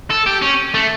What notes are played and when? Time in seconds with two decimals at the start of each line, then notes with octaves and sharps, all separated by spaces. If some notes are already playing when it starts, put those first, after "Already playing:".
0.11 A4
0.27 G4
0.42 C#4
0.75 A3